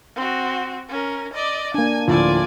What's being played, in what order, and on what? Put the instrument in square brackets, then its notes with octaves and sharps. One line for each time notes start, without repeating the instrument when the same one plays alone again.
[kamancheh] C4 F#4
C#4 A#4
D5 D#5
[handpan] A#3 D4 [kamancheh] G#5
[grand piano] D2 A2 F3 [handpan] F4 [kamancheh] D5 G#5